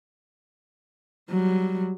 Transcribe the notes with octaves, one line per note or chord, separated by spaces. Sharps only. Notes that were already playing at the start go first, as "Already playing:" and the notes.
F#3 G3